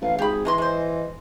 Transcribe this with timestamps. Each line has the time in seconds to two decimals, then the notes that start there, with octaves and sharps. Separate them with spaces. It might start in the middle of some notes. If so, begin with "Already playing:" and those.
0.01 A1 F5
0.19 G#1 G4 G#4 B5
0.45 E3 G#3 A#5 C6
0.58 G#3 C5 D#5